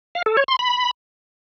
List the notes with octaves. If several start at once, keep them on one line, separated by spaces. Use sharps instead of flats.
F5
A4
C#5
C6
B5